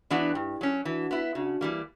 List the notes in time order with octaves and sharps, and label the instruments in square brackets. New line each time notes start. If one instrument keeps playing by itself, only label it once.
[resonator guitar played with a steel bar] E3 B3 D4 F#4
[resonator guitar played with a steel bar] G2 [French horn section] E4 G4
[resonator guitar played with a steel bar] F#3 C#4
[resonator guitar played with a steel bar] E3 [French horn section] D4 F#4
[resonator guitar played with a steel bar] B3 E4
[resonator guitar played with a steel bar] C#3 [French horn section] D4 F#4
[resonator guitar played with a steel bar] E3 G3 A#3